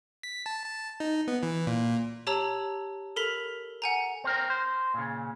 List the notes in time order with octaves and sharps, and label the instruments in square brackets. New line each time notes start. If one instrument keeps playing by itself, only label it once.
[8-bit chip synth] B6
A5
A5
D#4
B3
E3
A#2
[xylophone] G4 C#5 A5 A#5 E6 F#7
A4 A#4 B5 B6 F7
F#5 G#5 A#5
[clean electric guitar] C4 A#4
C5
A#2 C#3